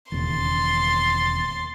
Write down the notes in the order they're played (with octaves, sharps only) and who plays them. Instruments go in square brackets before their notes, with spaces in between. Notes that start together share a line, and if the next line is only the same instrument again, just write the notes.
[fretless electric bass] E1 D#2 C#3 [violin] C6 A6